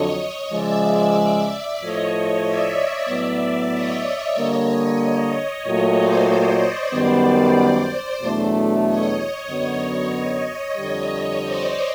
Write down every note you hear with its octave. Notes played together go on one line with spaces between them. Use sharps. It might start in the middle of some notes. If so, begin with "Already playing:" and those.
Already playing: F2 D3 F#3 C#5 D#5
C#3 F3 G#3 D5 E5
A2 F3 A3 C#5 D#5
D5 E5
A2 F#3 B3
C#5 D#5
D3 G3 A#3 C#5 D#5
A#2 F#3 A3 C#5 D#5
C5 D5
F#2 D#3 G3 B3 C5 D5
E2 B2 F#3 A3 D4
C#5 D#5
F#2 D3 F#3 B3
C#5 D#5
F2 D3 G3
C5 D5